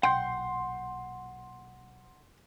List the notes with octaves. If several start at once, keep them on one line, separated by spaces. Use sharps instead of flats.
B1 A#2 F#5 G5 C6 G6